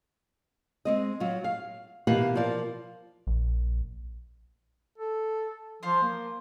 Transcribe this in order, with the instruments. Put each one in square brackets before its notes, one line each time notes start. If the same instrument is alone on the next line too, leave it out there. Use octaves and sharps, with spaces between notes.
[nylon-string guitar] G#3 C4 D#5
F#3 F4
F5
B2 E3 A#3 G4 F5 F#5
F3 F4 A#4 D5
[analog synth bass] A#1
[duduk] A4
[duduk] F3 [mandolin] F4 C5
[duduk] A#3